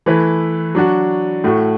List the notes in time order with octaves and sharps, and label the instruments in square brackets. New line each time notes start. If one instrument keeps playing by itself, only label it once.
[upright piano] E3 A3 E4 B4
F#3 D4 F#4
A2 A3 F#4